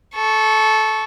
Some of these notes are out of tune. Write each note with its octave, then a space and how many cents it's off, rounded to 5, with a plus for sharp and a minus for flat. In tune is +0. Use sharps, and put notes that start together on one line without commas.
A4 -20 C#6 +0